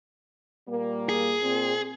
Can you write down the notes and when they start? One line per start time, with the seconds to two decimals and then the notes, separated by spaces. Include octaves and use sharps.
0.68 A#2 G3 A#3
1.09 G#4
1.42 A#2 C4